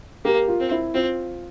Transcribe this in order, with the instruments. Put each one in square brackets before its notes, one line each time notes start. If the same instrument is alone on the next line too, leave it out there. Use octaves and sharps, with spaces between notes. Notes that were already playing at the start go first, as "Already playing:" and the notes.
[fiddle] A#3 [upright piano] G4
[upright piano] F4
[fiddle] C4
[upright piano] E4
[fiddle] C4 [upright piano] F4